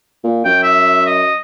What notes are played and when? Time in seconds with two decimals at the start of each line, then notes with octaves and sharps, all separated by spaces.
0.24 A#2
0.45 F#2 G5
0.63 E5
1.07 D#5